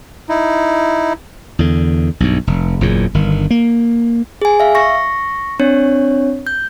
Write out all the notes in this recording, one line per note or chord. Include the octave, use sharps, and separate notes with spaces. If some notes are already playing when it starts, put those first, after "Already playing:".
D#4 E4
E2 D3
B1 G2
F1
F#1 E2 A#2 C#3
G1 D#3
A#3
G#4 G#5
E5 F5
C#6 A#6
C4 D4 C#5
G6